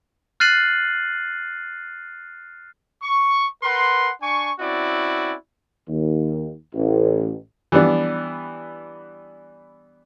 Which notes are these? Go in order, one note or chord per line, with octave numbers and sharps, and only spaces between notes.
F6 F#6 A6 C7 D#7 F#7
C#6
A#4 B4 F#5 C6
D4 G#5 C#6
C4 C#4 E4 F#4 D5
D#2
A1
E3 G3 B3 D4